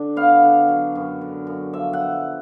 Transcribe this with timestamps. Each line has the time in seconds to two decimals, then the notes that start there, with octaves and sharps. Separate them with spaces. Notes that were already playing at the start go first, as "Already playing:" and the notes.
Already playing: D3 D4
0.16 B3 F5
0.43 D3
0.68 F#3
0.95 F#2
1.21 D3
1.47 F#2
1.73 F3 E5
1.93 F#5